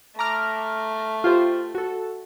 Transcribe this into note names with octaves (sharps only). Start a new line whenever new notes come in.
A3 A#5 D6 F6
F4 G4 C5
F#4 A4